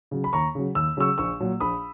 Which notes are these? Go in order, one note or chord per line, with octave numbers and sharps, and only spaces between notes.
C#3 F#3
B5
D#2 A#5 C#6
C#3 F#3
D#2 E6
C#3 F#3 C#6 E6
A#1 C#6 E6
A#2 F#3
A#1 B5 D#6